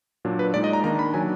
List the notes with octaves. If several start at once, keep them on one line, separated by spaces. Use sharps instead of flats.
A#2 F#3 D4
B4
A#2 G#3 D#4 D5
D#5
A#5
D#3 A#3 D4 A#5
B5
D#3 F#3 D4 G#5